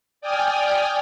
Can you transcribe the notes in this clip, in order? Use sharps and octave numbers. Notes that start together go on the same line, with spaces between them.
D5 G5 G#5 D#6 F6